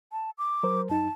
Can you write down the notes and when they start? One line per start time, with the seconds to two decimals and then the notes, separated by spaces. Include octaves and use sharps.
0.12 A5
0.38 D6
0.63 F#3 A#4 C5
0.89 F#2 D#4 A5